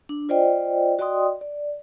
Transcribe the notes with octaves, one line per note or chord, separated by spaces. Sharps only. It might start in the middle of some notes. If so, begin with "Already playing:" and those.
D4
F4 C5 D5 D#5 G5
F#4 D5 D#5 G5 C6 D#6
D5